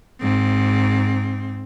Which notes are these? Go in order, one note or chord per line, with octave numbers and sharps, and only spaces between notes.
G#2 C4